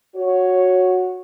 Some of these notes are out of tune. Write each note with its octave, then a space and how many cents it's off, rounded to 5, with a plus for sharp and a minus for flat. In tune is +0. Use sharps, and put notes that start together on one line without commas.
F#4 -10 C#5 +0